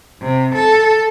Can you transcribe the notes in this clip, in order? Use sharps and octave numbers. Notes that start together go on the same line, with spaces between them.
C3
A4